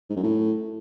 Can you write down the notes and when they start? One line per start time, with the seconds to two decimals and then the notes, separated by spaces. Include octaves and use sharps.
0.10 G#2
0.17 F#2
0.23 A2